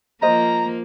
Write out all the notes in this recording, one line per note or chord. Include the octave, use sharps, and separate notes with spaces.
F3 A#3 C5 D#5 A#5